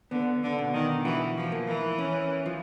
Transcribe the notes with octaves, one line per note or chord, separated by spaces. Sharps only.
D3 B3
D3
B2
D#3
E3 F#4
F3
A#3
E3
C#4
F3